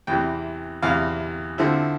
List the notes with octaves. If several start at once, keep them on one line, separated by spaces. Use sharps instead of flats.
E2 C3 E3 G5
E2 C3 E3 F5
D3 F3 C4 E4